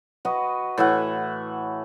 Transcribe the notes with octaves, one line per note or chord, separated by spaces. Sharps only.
F#4 B4 D#5
A2 E3 E5 F#5